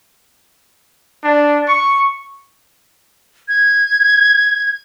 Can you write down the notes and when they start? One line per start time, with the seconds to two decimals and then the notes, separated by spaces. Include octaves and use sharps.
1.24 D4
1.67 C#6
3.48 G#6